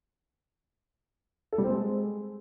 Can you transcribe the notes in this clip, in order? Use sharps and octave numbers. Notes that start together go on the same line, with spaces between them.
A4
G3
C4
G#3